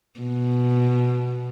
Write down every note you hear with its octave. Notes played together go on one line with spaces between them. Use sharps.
B2